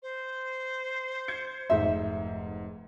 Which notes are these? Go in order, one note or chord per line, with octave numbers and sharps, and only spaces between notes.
C5
G6 G#6 C#7
F1 G#2 E5 C6